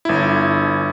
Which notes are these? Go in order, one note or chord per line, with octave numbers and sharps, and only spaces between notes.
G1 E4